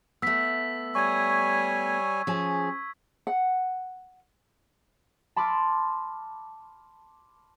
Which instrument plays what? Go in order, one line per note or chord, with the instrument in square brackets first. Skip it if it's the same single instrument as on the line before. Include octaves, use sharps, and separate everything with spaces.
[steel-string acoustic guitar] A3 B3 [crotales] E6 B6
[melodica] G3 C#5 G#5 [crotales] C#6 G#6
[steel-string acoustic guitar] F3 C#4 G#4
[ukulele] F#5
[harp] A5 B5 C6 D6 E6 F6